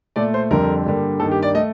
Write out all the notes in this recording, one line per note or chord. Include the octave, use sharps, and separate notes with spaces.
A#2 A3 D5
C5
F2 D3 G3 A#4
G2 D3 G3 A#3
G2 D#3 G3 A#3 A4
G4
D5
A3 D#5